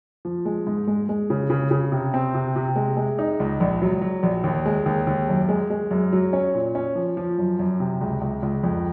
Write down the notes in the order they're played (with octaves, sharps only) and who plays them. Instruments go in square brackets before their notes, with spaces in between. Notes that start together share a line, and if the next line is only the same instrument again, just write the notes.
[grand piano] F3
G#3
G#2
G#3
G#3
C#3
C#3
C#3
C3
C4
C3
C3
G#3
G#3
D#4
C#2
A#1
F#3
F#3
A#1
D#2
G#3
D#2
D#2
F#2
G#3
G#3
F#2
F#3
C#4
A#2
C#4
F3
F3
F#2
F#2
C3
C#2
C#2
C#2
F2